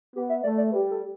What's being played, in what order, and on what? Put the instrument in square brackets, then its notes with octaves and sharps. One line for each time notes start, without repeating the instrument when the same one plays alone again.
[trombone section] B3 [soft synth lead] G4
[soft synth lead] E5
[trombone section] A3 [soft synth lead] D5
[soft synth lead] D5
[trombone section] G3 [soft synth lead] B4
[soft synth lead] A4